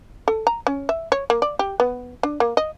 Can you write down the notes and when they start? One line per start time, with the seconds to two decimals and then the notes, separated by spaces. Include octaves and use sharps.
0.28 A4
0.47 A#5
0.67 C#4
0.89 E5
1.12 C#5
1.30 A#3
1.42 D5
1.59 G4
1.80 B3
2.23 D4
2.40 A#3
2.57 D#5